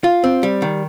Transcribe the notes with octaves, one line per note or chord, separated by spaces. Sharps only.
F4
C4
G3
D#3